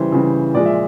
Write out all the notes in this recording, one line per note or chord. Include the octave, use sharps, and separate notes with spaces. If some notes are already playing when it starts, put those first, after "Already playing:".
Already playing: C#3 E3 G3 C5
C#3 E3 G3
A#2 F3 G#3 D5
E5